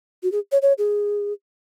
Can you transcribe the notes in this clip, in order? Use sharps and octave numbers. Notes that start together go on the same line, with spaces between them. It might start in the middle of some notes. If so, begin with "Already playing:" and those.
F#4
G#4
C#5
C#5
G#4